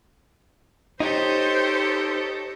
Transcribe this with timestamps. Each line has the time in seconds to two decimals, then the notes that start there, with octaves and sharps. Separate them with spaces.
1.00 D#4 G4 A4 C5 C#5 D#5